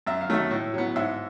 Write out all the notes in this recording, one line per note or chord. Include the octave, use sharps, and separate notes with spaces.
F#2 E5
F5
D#3 F#3 A3 E5
A2
F#3 B3
G#2 E5